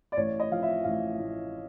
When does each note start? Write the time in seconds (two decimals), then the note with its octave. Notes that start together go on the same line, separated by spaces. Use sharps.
0.12 D5
0.17 A1 C#5
0.40 D#5
0.50 F3 F5
0.63 E5
0.84 A1 F5
1.19 A2